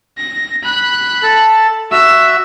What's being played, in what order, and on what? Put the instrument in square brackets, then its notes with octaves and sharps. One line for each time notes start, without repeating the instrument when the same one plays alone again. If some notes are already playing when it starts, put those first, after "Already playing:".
[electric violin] A#6
B5 F#6
[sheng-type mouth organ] A4 A5
[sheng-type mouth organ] F#4 E5 [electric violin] E6